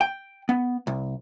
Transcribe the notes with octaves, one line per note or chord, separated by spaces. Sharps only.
G5
B3
C2